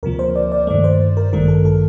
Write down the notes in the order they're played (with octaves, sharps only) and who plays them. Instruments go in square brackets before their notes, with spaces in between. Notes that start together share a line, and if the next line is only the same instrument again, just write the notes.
[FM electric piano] D2 C3 F3 A#3 A#4
C5
D5
D5
G2 D#3 A3 D5
C5
A#4
A1 G2 D#3 A3 A#4
A4
A4